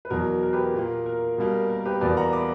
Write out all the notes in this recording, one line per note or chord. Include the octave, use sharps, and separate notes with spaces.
B4
E2 B2 F#3 A#4
A#4
G4 B4
A#2 A#3
A#4
B2 G3 A#3
A#4
G4 B4
E2 B2 A#3 B4 D5
F#5 A#5
B5 D6